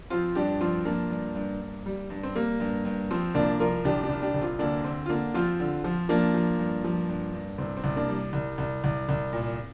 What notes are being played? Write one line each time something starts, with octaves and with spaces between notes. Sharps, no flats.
F3 C4 F4
G2 D4 G4
F3 C4 F4
F3 A#3 D4
G2
G2
G2
G3
G2
C4
G3 A#3
G2
G2
F3 C4
C2 A#3 D4
F3 F4 A#4
C2 D4 G4
D4 G4
C2
D4 G4
C2
C4 F4
D2 A#3 D4
D2 C4
F4
D3 A#3 D4
F3 C4 F4
D3
F3
F3 A#3 D4
F3
G2
F3
G2
G2
C2 C4
C4
C2
A#3 D4
G3
C2
C2
C2
C2
A#2